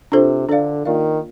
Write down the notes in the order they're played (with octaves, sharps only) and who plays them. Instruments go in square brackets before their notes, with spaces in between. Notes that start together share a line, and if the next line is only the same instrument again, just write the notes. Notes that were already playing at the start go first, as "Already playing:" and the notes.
[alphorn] C3 [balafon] D4 F4 A4 C5
[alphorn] D3 [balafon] D4 A4 D5 F5
[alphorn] D#3 [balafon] A#3 F4 A#4 D5 F5